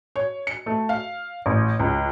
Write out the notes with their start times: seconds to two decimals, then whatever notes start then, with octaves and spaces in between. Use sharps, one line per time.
0.16 C#5
0.47 C#7
0.66 A3
0.89 F5
1.46 A1
1.79 C#2